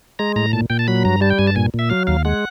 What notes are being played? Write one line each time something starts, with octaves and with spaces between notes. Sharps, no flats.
G#3 A#5
A2 A#5
A#2 A5
A#2 G5
A5
F#3 B5
G2 A#5
G3 A5
G5
G2 G#5
A5
A#2 G#5
A#2
E5
F#3 F5
D#2 F5
G#3 F#5